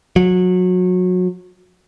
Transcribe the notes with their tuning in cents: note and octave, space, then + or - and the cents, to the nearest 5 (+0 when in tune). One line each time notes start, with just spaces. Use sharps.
F#3 -25